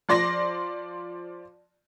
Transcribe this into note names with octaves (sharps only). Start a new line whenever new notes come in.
F3 D5 C6 A#6